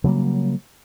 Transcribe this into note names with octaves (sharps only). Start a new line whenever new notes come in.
C#3 F#3 G3 A#3